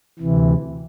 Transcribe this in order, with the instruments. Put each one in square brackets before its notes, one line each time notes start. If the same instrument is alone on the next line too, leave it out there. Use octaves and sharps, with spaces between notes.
[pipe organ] D2 C3 E3